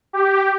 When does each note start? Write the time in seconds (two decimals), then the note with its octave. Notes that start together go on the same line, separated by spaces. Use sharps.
0.13 G4